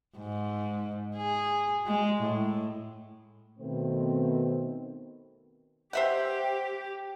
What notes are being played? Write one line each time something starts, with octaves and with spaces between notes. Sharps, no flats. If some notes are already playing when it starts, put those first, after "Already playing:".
G#2
G#4
G#3
A2
B2 D#3 A3 B3 C4
G4 C5 E5 F#5